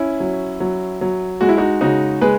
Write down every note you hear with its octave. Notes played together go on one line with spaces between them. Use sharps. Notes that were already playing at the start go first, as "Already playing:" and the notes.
Already playing: C#4 E4
F#3
F#3
F#3
G#3 F#4
E4
D#4 F#4
C#3 D#4 F#4
G#3 G#4 B4